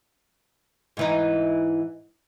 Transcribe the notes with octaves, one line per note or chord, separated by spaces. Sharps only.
G#2 E3 D#4